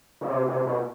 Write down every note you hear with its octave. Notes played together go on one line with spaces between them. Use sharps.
C#3
C3
C3
B2